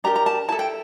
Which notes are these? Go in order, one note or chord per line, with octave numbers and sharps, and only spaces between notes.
D4 G4 A#4 A#5
A#5
A5
E4 A4 A5
G5